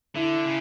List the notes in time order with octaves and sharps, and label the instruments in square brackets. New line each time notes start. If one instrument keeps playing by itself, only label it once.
[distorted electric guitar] D3 [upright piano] E4
[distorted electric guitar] C#3